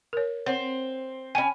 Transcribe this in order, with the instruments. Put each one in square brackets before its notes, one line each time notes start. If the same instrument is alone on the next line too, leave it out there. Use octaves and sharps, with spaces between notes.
[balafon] A#4 C#5
[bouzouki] C4 [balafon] C#5 F#5
[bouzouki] C#4 G#5 [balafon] G5 B5